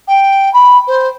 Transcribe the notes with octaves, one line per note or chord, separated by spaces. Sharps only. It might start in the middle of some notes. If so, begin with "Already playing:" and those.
G5
B5
C5